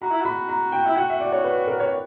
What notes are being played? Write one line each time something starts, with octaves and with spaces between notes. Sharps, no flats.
F#4 A#5
E4
F#4 B5
A#5
G5
E4
F#4 F#5
E5
D5
C#5
B4
A#4
C#5